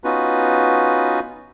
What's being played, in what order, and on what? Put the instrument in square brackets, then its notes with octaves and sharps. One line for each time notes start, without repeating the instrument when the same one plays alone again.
[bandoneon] B3 C#4 D#4 F4 F#4 B4